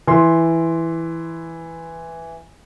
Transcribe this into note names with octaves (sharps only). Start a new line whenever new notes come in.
E3 C6